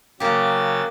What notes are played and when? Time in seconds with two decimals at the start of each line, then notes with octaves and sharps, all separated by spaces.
0.20 C#3 F#3 A#3 G4 A6